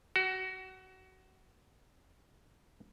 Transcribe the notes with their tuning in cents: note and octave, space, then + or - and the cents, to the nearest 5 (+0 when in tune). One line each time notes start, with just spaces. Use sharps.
F#4 +25